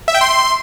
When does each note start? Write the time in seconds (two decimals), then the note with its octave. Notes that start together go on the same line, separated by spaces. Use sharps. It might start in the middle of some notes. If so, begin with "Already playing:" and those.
0.08 E5
0.14 G5
0.21 C6